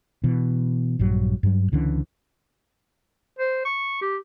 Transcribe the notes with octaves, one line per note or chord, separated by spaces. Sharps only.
B2 E3
A#1 G2 F#3
G2 F#3
C#2 D3 E3 C#4
C5
C#6
G4